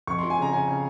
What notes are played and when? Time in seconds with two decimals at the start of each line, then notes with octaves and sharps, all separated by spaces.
0.07 F2 C#6
0.19 F3 C6
0.30 G#5
0.38 C#3 A#5
0.52 C#3 G#5
0.68 C#3